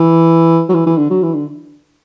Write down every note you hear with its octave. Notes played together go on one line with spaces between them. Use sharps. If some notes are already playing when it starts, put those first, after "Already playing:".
Already playing: E3
F#3
E3
E3
D3
F#3
E3
D3